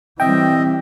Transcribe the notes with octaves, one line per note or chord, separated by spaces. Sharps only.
E3 G3 C4 D#5 E5 G5